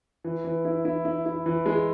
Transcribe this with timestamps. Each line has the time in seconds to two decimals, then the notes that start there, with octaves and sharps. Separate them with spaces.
0.24 E3
0.44 E3
0.65 E4
0.85 E4
1.05 E4
1.26 E4
1.46 E3
1.66 G#3